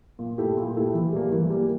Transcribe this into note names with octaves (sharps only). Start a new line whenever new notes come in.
A#2
A3 E4 G4
A#2
A3 E4 G4
E3
G3 A#3
E3
G3 A#3